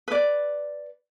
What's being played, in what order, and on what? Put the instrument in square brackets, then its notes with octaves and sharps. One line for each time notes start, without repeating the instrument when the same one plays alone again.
[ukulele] B4 D5